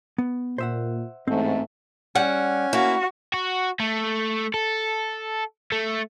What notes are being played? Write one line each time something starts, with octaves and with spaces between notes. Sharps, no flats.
B3
A#2 C5 E5 F#5
A1 G#2 A3 C4
G3 C#4 F#5
A#3 E4 F#4
F#4
A3
A4
A3